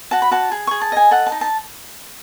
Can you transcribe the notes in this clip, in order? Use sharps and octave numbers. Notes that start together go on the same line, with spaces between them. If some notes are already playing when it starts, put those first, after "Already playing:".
F#4 A5
B5
F#4 A5
G#4
G#4 C#6
A5
D#5 G#5
A4 F#5
A5
D#4
A5